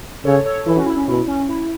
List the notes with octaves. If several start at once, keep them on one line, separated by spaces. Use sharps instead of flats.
C#3 A4 C#5
A4 C#5
E3 E4 A4
C#4 F#4
E4
C#4
B2 E4
C#4
E4